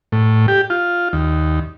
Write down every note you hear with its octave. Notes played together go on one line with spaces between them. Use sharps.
A2
G4
F4
D#2